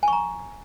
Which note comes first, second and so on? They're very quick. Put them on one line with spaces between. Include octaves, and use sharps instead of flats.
G#5 C#6 A#5